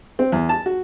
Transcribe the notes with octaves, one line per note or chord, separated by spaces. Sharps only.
C4
E2
A5
F#4